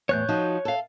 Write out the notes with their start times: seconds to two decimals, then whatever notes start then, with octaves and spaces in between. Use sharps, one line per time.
0.09 E2 A2 C#5 F#6 G6
0.29 F3 D#4 F#4
0.65 A4 F5